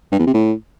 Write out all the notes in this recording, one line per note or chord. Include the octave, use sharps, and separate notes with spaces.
G2
E2
C3
A2